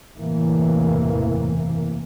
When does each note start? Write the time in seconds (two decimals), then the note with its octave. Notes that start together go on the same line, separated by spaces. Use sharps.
0.17 F#1 E2 A2 C3 E3 A#3